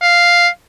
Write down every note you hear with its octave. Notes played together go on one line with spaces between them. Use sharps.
F5